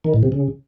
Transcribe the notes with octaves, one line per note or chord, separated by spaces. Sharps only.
D#3
A2
C3
C#3